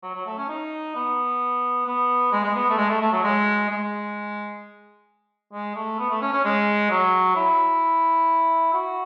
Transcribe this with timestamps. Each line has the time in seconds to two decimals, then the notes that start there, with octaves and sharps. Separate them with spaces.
0.03 F#3
0.14 F#3
0.26 A3
0.37 C#4
0.49 D#4
0.95 B3
1.86 B3
2.32 G#3
2.44 G#3
2.55 B3
2.70 A3
2.78 G#3
2.89 A3
3.01 A3
3.12 F#3
3.24 G#3
3.70 G#3
5.53 G#3
5.76 A3
5.99 B3
6.10 A3
6.22 C#4
6.33 C#4
6.45 G#3
6.90 F#3
7.36 E4
8.74 F#4